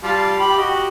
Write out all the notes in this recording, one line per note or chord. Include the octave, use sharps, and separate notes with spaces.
G3 F4 A5
G4 B5
F#4 G4 D#5